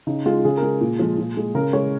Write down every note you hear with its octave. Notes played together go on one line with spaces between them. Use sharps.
C#3 D#4
G#3 F4
C#3 G#4
A#4
G#3 G#4
A#2
F3 G#3
A#2
G#3
C#3 A#4
G#3 C#5